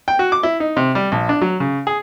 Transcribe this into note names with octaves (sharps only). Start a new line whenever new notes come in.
G5
F#4
D6
E4
D#4
C3
G3
A#1
D4
F#3
C#3
G#4